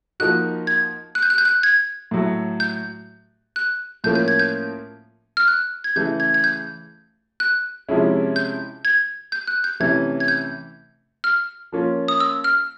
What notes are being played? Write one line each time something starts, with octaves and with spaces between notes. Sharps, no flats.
F3 A#3 D#4 F#4 F#6
G#6
F#6
G6
F#6
G6
F#6
G#6
A2 F#3 A3
G6
F#6
A2 F3 A#3 C#4 G6
G6
G#6
G6
F6
F#6
G#6
C#3 E3 A3 G6
G#6
G#6
G6
F#6
C3 F3 G#3 C#4 E4
G6
G#6
G6
F#6
G6
C3 E3 A3 C#4 G#6
G#6
G6
F6
F3 A#3 C#4 F4
D#6
E6
F6